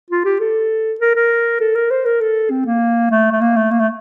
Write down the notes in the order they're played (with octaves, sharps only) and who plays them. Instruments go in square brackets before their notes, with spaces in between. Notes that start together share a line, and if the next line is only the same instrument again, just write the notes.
[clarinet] F4
G4
A4
A#4
A#4
A4
A#4
C5
A#4
A4
C4
A#3
A3
A3
A#3
A3
A#3
A3